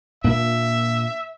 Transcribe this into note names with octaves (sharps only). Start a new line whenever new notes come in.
A#2 A#3 D4 E5